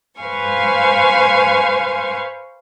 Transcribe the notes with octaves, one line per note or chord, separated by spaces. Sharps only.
B4 C5 F5 G#5 C#6